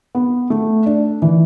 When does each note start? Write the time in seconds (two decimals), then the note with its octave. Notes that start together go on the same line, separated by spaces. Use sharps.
0.15 B3
0.50 A3
0.86 D4
1.22 E3